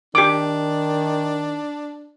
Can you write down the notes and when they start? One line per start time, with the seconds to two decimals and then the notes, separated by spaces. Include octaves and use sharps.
0.15 D#3 D4 G4 D6